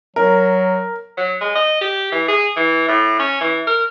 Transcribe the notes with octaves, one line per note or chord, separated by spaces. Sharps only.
F#3 A#4
F#3
G#3
D#5
G4
E3
G#4
E3
A2
C#4
E3
A#4